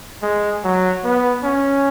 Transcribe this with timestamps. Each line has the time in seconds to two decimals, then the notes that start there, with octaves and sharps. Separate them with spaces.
0.23 G#3
0.64 F#3
1.04 B3
1.43 C#4